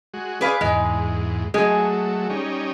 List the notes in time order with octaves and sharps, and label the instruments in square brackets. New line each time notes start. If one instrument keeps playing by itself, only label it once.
[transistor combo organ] G#3 F#4
[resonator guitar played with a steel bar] G#4 B4 F5 [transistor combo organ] D5
[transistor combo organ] E2 G#2 [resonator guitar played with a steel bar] G#3
[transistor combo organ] F#3 A3 [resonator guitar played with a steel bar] G#3 G#4
[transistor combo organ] G3 C#4 D#4